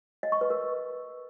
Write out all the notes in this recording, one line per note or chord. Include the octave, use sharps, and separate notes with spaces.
D#5
C#6
B4
A#4